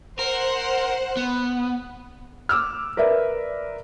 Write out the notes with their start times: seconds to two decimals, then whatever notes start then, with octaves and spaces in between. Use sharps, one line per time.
0.19 A#4 C5 F#5
1.17 B3
2.49 D6 E6 F6
2.97 A#4 B4 D5 E5